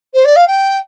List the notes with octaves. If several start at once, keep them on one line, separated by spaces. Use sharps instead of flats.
C5
D5
F5
G5